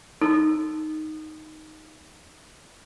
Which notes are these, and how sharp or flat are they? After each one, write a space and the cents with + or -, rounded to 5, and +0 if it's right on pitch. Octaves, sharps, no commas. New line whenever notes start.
D#4 +0 A4 +0 E6 +0